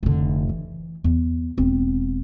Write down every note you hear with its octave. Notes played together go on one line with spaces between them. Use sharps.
F1 D3
E3
E2
E1 C4